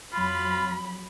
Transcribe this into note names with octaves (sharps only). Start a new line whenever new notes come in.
F2 F#3 F4 B5